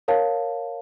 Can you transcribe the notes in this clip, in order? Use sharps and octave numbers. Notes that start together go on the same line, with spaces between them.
A#4 C#5 F5 A5